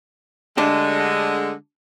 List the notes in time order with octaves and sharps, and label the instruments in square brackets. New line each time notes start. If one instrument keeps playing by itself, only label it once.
[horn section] D3 G#3 [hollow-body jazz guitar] A3 D4 G4